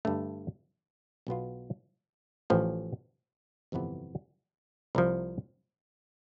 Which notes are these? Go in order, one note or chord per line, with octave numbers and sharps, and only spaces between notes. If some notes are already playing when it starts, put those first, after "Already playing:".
G2 D3 A3
B1 B2 B3 F4
A1 A2 F3
G1 F2 C3 E3 B3
C2 C3 F3